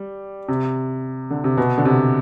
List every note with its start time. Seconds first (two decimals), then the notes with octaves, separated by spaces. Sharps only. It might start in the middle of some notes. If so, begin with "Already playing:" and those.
Already playing: G3
0.48 C3
1.30 D3
1.44 C3
1.57 B2
1.78 D3
1.85 C3